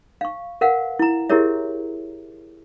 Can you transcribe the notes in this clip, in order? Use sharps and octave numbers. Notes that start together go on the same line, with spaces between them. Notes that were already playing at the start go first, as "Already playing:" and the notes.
F5 C#6
A#4 B4 F5 F#5
E4 A#5
E4 G4 G#4 A#4 C#5 E5